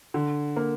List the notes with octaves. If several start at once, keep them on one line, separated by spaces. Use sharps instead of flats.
D3
A#3